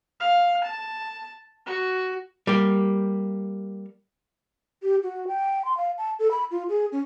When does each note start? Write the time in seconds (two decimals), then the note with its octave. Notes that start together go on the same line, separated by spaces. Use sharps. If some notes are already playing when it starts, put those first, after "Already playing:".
0.21 F5
0.65 A5
1.67 F#4
2.47 G3 A#3 G4
4.83 G4
5.03 F#4
5.28 G5
5.65 C6
5.77 F5
5.98 A5
6.19 A4
6.31 B5
6.51 F4
6.69 G#4
6.92 C#4